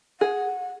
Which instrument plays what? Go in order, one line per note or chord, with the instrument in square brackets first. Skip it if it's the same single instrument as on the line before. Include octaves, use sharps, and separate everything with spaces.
[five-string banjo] G#4 [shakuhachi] F#5